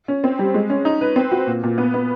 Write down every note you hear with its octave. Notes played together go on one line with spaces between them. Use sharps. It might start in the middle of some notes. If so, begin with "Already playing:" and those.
C#4
C4
G3
G#3
C#4
D#4
B4
C4
F#4
A#2
A#2
B3
B3